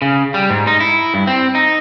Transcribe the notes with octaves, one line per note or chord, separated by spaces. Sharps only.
C#3
G3
G#2
D#4
E4
G2
C4
D#4